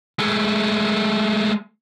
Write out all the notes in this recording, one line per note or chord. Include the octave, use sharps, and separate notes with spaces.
G#3 A3